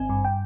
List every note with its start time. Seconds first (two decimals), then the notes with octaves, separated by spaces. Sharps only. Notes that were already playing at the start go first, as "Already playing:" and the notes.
Already playing: G#1 C4 G#5
0.09 G2
0.25 G5